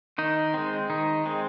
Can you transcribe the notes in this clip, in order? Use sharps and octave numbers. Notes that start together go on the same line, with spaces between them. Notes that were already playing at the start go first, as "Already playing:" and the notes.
D#3 D#4
G#3 C4
D#3 D#4
G#3 C4